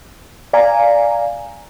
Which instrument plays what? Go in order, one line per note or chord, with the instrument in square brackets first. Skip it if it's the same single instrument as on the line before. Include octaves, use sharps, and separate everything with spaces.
[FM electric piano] D5 F5 G#5 A#5